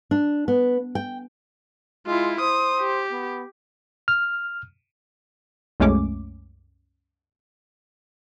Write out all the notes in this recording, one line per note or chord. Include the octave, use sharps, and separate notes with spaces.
D4
B3
G5
G#3 E4 F4
C5 D#6
G4
B3
F6
C2 F#2 G#3 A3 C#4 D6